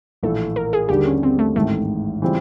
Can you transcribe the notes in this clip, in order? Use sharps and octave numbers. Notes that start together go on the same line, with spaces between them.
A#1 A2 E3 A3 A4
A#4
G#4
D#2 D3 G3 G4
C#4
C4
A3
A1 G#2 D#3 A3
C#3 E3 G3 C4 F4